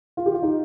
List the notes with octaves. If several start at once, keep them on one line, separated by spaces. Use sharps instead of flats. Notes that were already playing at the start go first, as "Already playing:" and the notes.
F4
G4
F4
D#4